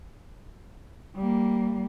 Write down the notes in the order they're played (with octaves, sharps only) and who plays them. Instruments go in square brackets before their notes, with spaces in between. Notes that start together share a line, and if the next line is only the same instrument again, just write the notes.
[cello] G3 A#3